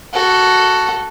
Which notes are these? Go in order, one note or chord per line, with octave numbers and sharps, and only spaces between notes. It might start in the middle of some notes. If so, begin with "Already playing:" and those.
F#4 A4